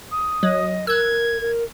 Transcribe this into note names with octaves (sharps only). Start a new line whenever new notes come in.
D#6
F#3 D#5
A#4 E6 F#6 G#6
A#4